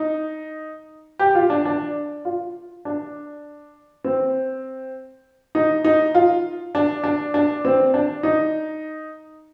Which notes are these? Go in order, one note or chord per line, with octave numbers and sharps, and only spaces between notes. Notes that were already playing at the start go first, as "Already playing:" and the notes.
Already playing: D#4
G4
F4
D4
D4
F4
D4
C4
D#4
D#4
F4
D4
D4
D4
C4
D4
D#4